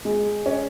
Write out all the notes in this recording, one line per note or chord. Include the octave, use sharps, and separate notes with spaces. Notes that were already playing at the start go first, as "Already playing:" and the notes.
G#3
C#4